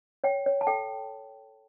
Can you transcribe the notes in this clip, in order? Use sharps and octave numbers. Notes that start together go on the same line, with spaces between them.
C#5 G5
C#5
A5
A4 G5